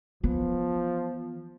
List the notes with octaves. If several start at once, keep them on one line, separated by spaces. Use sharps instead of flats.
E3 F3 B3